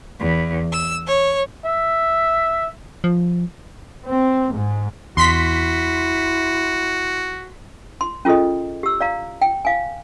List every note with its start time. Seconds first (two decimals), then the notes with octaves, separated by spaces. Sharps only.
0.20 E2
0.72 E6
1.06 C#5
1.65 E5
3.04 F3
4.06 C4
4.53 G#2
5.17 E2 E4 F#4 C6 B6
8.01 C6
8.25 C#4 F4 G#4 A4 D#5
8.83 G4 E6
9.01 D5 F5 A#5
9.42 G5
9.65 F5 G#5